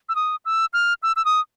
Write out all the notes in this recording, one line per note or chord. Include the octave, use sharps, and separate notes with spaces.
E6
D#6
E6
F6
E6
E6
D#6